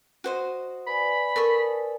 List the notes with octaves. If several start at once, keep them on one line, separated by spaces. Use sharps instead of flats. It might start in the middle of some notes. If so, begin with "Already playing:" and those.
F#4 C5 D#5
B4 D5 G#5 B5
A4 A#4 C#6 D#6